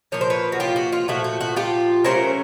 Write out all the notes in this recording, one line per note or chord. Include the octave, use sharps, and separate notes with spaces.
A#2 F3 A#3 C#5
C5
B4 C#5
F#4
F4 G4
F#4
F4
A#2 F3 A3 F#4
F#4
F#4
F4 G4
F#3 A3 C#4 A#4 C5